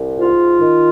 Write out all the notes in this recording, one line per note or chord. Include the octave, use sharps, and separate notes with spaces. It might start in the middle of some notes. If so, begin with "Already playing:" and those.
Already playing: C2
G#2 F4
D#3